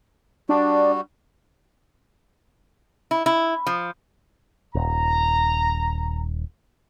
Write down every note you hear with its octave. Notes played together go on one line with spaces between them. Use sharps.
G3 D4 F#4
E4
E4
F3
D#1 A#5